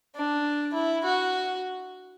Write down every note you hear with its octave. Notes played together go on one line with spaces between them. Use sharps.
D4
E4
F#4